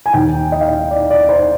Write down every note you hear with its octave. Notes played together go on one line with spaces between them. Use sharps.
G#5
D#2 D#3 G5
D#5
F5
D#5
D5
D5
C5